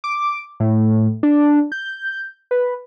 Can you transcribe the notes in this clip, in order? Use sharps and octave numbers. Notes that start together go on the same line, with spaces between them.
D6
A2
D4
G6
B4